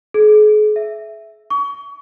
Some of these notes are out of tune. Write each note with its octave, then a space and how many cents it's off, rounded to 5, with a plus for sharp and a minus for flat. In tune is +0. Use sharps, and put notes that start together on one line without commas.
G#4 +40
E5 +5
C#6 +30